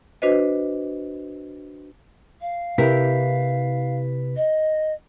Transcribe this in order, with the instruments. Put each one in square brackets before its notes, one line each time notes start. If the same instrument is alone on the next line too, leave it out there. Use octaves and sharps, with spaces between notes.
[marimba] D4 F#4 B4 C5 D#5
[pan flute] F5
[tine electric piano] C3 B4 B6 [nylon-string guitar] E4 G4 A#4
[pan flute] D#5